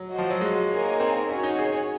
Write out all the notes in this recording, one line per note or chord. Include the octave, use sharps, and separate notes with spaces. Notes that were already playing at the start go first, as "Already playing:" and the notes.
Already playing: F#3
F#4 C5 D#5
F3
F#3
G#3
A#3 D#4 A#4 C#5 G#5
C4
C#4 F#4 C#5 G#5
D#4
G#4